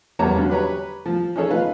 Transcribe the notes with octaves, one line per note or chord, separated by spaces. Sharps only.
E2 G3 A#3 C#5 A5 A#5
D3 F#3 C#4
G4 B4 C#5 A#5
F3
C#4 D#4 G#4 A4 C#5
D#4 F4 B4 D#5 F5